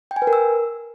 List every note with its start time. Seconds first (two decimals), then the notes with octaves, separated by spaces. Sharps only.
0.11 G5
0.16 G#5
0.22 B4
0.27 A#4
0.33 E6